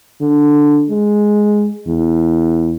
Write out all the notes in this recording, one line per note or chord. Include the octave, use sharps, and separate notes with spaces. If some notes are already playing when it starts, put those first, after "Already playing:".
D3
G#3
E2